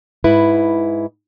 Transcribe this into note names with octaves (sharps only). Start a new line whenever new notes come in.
G#2 E4 B4